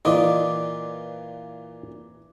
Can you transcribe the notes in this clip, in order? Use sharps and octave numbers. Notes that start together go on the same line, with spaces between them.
A#2 E3 F4 D5 D#5 D6